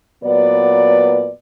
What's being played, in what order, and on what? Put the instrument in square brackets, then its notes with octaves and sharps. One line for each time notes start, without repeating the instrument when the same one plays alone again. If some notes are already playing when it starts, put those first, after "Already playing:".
[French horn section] A#2 F#3 B3 B4 D5